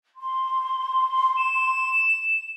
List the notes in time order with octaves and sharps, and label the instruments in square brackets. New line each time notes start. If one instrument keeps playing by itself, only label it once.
[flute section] C6
[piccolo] E7